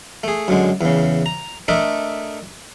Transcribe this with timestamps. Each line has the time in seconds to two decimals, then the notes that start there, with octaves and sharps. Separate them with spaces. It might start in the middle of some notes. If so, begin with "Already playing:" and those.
0.23 A3 G#4
0.48 F#2 D3 G#3
0.81 E2 C#3
1.26 A#5
1.68 A3 D4 A4 A#4 D#5 E5